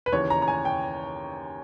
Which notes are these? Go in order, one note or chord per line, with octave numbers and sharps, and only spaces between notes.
B4
D#2 C#3 E3 C#5
A#5
A#5
G#5
G5